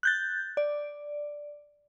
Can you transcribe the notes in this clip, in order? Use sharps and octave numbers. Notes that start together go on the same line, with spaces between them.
F#6 G6 A6
D5